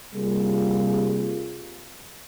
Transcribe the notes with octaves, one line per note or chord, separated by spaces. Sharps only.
C3 G3 A#3 F4 G#4